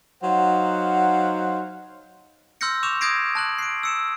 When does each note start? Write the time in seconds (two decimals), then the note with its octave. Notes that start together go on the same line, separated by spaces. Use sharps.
0.23 F#3 D#4 C5 F5 F#5
2.61 C6 E6 F6 G6 A#6 C#7
2.83 C#6 D6 G6 E7 F7
3.01 D#6 G6 G#6 A#6 C7 D7
3.35 A5 F#6 F#7
3.59 C7 D7
3.83 E6 C#7 E7